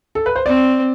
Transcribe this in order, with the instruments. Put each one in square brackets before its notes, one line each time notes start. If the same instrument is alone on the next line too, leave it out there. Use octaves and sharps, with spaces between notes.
[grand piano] A4
B4
C5
[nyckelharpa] C4 [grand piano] D5